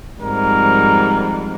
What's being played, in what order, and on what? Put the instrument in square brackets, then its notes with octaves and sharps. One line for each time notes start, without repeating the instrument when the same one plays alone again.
[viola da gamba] F2 G#2 G3 [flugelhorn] A#4